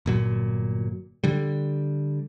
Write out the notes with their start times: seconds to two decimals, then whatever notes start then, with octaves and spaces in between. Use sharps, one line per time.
0.06 G1 A#2 F#3
1.24 D3 G3